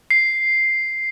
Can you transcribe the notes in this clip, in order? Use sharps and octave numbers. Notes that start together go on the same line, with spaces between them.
C7